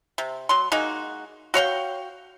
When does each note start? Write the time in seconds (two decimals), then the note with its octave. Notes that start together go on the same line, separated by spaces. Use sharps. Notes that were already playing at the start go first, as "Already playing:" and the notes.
0.18 C3
0.49 F#3 C6
0.72 G#3 A#3 D#4 F#4
1.54 F#4 C#5 F5 G5